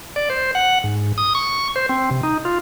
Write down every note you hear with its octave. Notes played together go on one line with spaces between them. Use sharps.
D5
C5
F#5
G#2
D#6
C#6
C5
C4
C3
D#4
F4